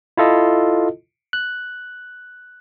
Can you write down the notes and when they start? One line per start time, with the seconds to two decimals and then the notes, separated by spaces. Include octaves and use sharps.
0.17 E4 F4 A4 D#5
1.33 F#6